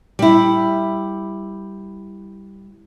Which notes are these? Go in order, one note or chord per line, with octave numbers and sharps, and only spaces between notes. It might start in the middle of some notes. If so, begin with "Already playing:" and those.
G3 E4